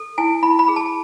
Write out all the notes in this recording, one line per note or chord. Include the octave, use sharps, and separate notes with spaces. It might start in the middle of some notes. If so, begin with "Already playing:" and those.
Already playing: A4
E4 G#5
E4 B5
B5
G#4
A5